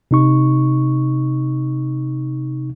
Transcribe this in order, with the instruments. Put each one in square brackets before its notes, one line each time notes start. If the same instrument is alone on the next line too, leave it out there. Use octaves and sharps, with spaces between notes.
[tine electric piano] C3 D#4 C#6